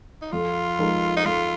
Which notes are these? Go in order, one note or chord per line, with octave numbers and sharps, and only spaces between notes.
D#4
F2 F4
F3 G#3 D#4 A#4
D#4
F2 F4